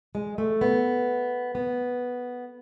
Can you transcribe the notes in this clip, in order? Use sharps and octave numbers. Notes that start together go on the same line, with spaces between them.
G#3
A3
B3
B3